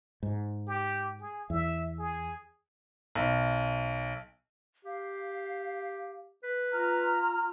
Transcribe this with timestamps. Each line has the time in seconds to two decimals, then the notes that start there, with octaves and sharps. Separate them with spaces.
0.23 G#2
0.67 G4
1.21 G#4
1.50 E2 E5
1.99 G#4
3.15 B1
4.85 G4 F5
6.43 B4
6.72 F4 A#5 F6